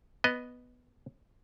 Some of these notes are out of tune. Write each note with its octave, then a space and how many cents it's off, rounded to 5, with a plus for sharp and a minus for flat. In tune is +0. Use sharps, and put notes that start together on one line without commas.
B3 +0 D#5 +0